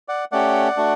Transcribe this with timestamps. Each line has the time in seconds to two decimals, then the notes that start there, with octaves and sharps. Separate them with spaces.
0.08 D5 F#5
0.32 A3 C#4 G4 D5 F#5
0.77 A3 D4 F#4